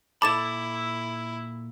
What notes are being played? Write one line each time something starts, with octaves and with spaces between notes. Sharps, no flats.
A#2 E4 A4 A5 B5 D6 A6 E7